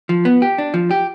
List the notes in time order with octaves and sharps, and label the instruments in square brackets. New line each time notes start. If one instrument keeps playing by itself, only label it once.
[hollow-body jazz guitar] F3
B3
G4
D4
F3
G4